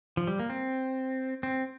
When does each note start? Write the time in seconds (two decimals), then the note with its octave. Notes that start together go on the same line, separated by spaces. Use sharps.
0.17 F3
0.27 G3
0.39 A#3
0.50 C4
1.43 C4